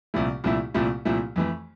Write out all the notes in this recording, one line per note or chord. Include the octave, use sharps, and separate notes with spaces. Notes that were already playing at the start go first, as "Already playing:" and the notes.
C2 A#2 F3 A3 E4
C2 A#2 F3 A3 E4
C2 A#2 F3 A3 E4
C2 A#2 F3 A3 E4
F2 E3 A3